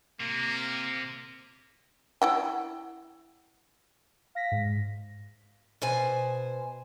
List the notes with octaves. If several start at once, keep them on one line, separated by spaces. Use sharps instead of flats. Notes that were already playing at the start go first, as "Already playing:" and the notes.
C3 A#3
E4 F#5 G5
F5 A#6 B6
G#2
B2 C5 G#5